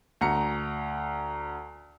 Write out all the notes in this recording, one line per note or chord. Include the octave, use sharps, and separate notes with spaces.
D2 A#5 C#7